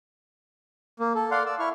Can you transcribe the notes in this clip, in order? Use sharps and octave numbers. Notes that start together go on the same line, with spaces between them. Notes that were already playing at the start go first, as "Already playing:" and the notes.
A#3
A4
D5 F5 F#5 C6
D5 E6
E4 C#6 F6